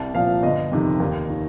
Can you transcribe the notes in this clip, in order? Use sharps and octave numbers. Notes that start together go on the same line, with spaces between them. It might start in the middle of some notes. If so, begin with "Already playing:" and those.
Already playing: C2 A5
A#2 F3 F5
G1 D#5
F2 C3 D#3
D#2
D#3